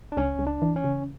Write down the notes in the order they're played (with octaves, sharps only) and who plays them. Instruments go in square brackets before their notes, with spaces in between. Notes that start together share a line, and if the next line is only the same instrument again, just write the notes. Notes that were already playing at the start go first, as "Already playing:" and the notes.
[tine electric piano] D4
[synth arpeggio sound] C#2 [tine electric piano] C#4
[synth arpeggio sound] C#2
[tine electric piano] D4
[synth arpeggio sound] E3
[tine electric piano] C#4
[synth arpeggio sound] C#3